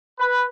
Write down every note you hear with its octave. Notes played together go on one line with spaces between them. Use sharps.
B4